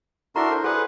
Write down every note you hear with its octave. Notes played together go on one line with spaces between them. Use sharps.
D4 E4 F#4 A4 A#4 E5 A#5 C6
C5
G#4 A4 B4 F#5